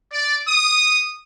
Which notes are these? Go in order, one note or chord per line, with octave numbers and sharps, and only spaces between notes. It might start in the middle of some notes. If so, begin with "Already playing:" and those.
D5
D#6